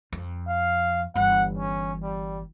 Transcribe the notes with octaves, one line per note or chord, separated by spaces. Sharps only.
F2
F5
G1 E3 F#5
C#4
G3